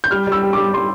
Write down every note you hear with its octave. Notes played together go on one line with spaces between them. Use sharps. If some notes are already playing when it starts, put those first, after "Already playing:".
G6
G3 F6
G3 E6
G4
G3 D6
G3 C6